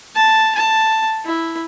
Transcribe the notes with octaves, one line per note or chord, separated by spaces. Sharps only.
A5
A5
E4